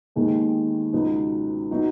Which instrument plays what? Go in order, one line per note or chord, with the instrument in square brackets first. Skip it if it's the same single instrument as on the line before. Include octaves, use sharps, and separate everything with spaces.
[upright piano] D#2 D#3 G#3 B3 D#4
C#2 B2 F#3 B3 D#4
F#3 B3 D#4